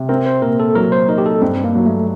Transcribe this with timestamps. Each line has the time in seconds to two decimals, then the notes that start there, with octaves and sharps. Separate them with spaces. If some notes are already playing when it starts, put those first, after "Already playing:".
Already playing: C3
0.09 C4 A#4
0.26 C5
0.42 A#2 A#4
0.60 A4
0.75 F#3 A#4
0.92 C5
1.08 D#4 A#4
1.18 G4
1.26 A4
1.42 G2 C4
1.64 A#3
1.75 F#3
1.86 A3